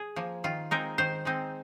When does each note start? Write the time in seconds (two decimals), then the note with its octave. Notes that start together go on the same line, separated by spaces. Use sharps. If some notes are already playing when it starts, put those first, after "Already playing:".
Already playing: G#4
0.16 F3 A#3
0.44 D#3 F4
0.71 G#3 C4 D#4 A#4
0.98 D#3 C5
1.25 G#3 C4 D#4